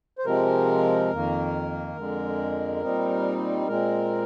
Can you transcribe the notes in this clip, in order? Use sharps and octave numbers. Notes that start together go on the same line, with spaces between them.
C5
C3 F3 G#3 C4 A#4
F2 D#3 A#3
F2 D3 G#3
A#2 G3 C4 D#4
A#2 G#3 C4 A#4